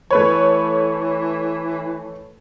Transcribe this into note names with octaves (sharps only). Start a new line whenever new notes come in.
E3 A3 B4 C#5